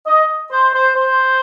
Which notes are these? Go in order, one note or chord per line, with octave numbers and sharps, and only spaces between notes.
D#5
C5
C5
C5